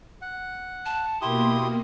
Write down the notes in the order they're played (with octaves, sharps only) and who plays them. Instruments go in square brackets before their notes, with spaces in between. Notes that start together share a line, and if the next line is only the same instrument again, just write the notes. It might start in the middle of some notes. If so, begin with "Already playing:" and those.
[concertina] F#5
[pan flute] A5
[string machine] B2 A#3 [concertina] E4 G4 D#6 [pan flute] C6